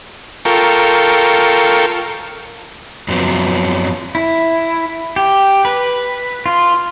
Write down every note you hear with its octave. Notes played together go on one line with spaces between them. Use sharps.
F4 A4 A#4 G5 C#6
F#2 F3 F#3 B3 C4
E4
G4
B4
F4